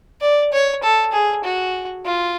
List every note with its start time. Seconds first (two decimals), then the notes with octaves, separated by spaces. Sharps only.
0.21 D5
0.53 C#5
0.83 A4
1.13 G#4
1.44 F#4
2.05 F4